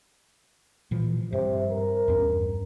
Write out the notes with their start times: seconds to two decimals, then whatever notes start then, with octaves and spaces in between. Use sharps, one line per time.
0.91 A#2 E3 F3
1.32 G2 C3
1.70 A#4
2.08 E2 G2 C#4